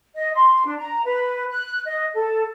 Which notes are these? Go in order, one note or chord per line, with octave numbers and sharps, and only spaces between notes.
D#5
C6
D4
A#5
B4
F#6
D#5
A4